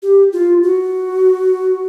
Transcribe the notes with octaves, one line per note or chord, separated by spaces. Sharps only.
G4
F4
F#4